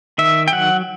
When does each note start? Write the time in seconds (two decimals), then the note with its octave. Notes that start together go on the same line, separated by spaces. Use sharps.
0.18 D#3 E5
0.48 G5
0.52 F#3 F#5